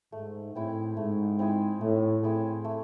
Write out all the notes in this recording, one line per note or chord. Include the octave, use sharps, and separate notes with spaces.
G#2 A3
A2 C4 E4 G#4
G#2 A3
C4 E4 G#4
A2 A3
A2 C4 E4 G#4
A3